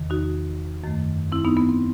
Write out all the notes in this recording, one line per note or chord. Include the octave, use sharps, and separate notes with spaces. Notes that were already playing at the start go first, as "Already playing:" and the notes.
Already playing: E2 C3 D#3
D#4 F#4
F#2 D#3 A3
C4 E4
B3 D#4
B3
C4